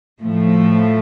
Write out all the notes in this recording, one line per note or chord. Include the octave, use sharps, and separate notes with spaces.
A2 F3 A3